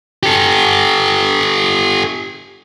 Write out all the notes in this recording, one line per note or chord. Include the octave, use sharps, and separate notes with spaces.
G4 A4